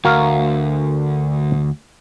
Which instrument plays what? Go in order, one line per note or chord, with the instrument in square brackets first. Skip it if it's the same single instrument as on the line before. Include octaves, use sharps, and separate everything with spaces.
[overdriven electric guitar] D2 [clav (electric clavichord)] F#4 A#4 F5